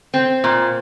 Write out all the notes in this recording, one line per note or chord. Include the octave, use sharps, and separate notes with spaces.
C4
A#2